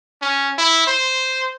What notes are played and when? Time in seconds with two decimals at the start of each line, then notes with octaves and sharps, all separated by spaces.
0.22 C#4
0.58 E4
0.87 C5